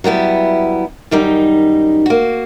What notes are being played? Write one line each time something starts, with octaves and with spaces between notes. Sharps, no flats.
F#3 G3 B3 E4
F#2 D#3 G3 D#4
A#3 F#4